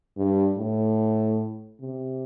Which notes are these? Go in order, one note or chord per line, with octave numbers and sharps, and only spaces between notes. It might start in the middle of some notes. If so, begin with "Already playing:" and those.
G2
A2
C3